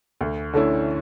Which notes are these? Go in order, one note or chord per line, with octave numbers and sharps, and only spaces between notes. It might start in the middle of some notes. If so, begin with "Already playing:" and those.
D2
D3 A3 C#4 E4